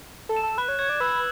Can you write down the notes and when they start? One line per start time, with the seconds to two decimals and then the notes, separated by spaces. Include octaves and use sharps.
0.29 A4
0.36 E7
0.43 A4
0.58 B4 F#6
0.68 C#5
0.79 C#5 G#6
0.89 D5
1.00 B4 E6